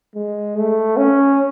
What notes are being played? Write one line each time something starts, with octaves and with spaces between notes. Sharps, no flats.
G#3
A3
C#4